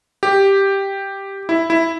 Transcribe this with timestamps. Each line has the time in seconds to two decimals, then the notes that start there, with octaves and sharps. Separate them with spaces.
0.23 G4
1.49 E4
1.70 E4